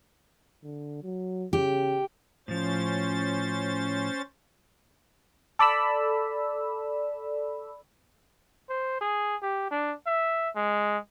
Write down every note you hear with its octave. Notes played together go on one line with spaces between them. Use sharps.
D3
F#3
C#3 G4
A2 F3 C#4 C5 A6
A4 D5 B5 E6
C5
G#4
G4
D4
E5
G#3